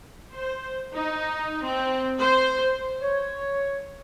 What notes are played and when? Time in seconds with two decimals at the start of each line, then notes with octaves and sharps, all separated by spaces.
0.33 C5
0.94 D#4
1.66 C4
2.20 C5
3.02 C#5